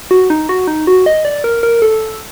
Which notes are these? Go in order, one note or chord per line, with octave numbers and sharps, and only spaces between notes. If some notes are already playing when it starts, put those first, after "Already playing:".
F#4
D#4
F#4
D#4
F#4
D#5
D5
A#4
A#4
A4